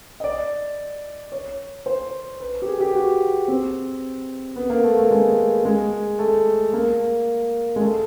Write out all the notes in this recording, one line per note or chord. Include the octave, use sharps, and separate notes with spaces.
D#5
D5
C#5
C5
B4
G4
G#4
G4
F#4
C4
B3
A#3
A3
A3
G#3
G#3
A3
A#3
G#3
A3